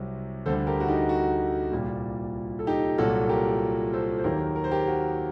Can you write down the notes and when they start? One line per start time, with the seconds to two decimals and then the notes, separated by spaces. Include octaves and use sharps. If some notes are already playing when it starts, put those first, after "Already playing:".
Already playing: C2 C3 F#3
0.46 D2 D3 G3 A4 C5
0.67 G4 A#4
0.80 F#4
0.88 D#4 G4
1.09 F#4
1.72 C2 A#2 G3
2.59 A4
2.67 D#4 G4
2.98 C2 A#2 F#3 F#4 A4
3.29 G4 A#4
3.93 A4 C5
4.18 C5
4.24 D#2 D#3 F#3 G4 A#4
4.56 A#4
4.64 C5
4.71 G4 A#4
4.87 F#4